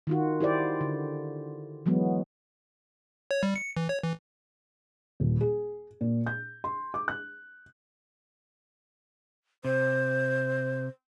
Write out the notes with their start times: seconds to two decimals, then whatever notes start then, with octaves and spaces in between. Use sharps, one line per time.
0.07 D#3 F4 F#4
0.41 E4 G4 C5 D5
0.81 D3
1.86 E3 F#3 G#3 B3
3.31 C#5
3.43 G3
3.56 C#7
3.77 E3
3.89 C#5
4.03 E3
5.20 D#1
5.41 G#4
6.01 A#2
6.26 G6
6.64 C6
6.94 D6
7.08 F#6
9.65 C3 C5